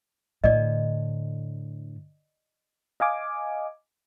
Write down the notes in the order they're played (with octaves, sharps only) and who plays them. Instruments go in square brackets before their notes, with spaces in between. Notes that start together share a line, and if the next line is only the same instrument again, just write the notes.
[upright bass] A2 D3 [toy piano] D5 D#5
[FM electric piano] D#5 F5 G#5 D6